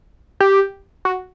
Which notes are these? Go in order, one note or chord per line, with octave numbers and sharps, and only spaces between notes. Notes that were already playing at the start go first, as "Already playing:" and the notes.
G4
F#4